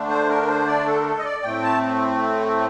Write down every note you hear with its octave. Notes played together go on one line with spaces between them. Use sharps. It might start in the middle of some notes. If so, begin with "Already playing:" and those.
Already playing: D3 A3 D4
C5
A#4
C5
D5
A4
A#4
A4
D#5
D5
A2 A3 C4 G5
A5